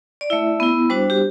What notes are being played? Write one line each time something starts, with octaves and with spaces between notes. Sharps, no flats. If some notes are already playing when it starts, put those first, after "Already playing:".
D5
A3 E4 E5
B3 E4
G3 D4 F#4 C5
G4